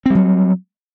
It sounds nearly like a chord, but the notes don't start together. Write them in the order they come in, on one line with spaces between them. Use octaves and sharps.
C4 G3 F#3